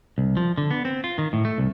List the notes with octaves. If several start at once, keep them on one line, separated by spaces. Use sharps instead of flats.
C2
F3
D3
B3
C4
F4
D#3
A2
A3
C2